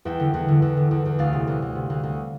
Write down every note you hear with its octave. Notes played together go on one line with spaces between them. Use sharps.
E2 E5 G5
D3
E2
D3
E2
D3
E2
E2
D2 D5 F5
C3
D2
D2
C3
D2
D2